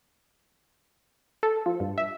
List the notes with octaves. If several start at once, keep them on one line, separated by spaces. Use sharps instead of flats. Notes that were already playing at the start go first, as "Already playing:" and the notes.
A4
F3
G2
E5